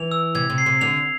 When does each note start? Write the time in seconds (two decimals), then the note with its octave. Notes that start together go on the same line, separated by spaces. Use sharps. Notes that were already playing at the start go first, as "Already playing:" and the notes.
Already playing: E3 F7
0.12 E6
0.35 C3 G#6
0.50 C3
0.58 C7
0.66 C3
0.81 D3 F7